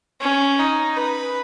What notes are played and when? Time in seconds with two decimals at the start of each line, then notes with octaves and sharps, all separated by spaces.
0.21 C#4
0.59 D#4
0.97 B4